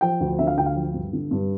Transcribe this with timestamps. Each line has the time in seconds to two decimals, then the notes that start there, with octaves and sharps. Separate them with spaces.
0.01 F3 G5
0.20 D2
0.39 D3 E5
0.47 F5
0.57 D2 G5
0.66 F5
0.75 F3
0.94 G2
1.13 D3
1.31 G2